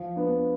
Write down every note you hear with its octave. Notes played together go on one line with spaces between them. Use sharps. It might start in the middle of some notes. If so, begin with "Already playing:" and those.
Already playing: F3 F5
B3 D4